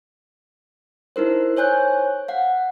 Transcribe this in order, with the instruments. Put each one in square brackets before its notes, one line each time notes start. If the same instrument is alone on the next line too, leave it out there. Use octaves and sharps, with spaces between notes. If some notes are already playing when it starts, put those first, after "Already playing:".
[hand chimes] D#4 E4 A#4 C5
C5 C#5 G#5 F#6 G6
F5 F#5